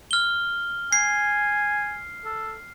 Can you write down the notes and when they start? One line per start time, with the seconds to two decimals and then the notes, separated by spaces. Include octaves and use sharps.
0.11 F6 G7
0.93 G#5 C7
2.25 A4